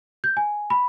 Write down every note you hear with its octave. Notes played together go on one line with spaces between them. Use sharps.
G6
G#5
B5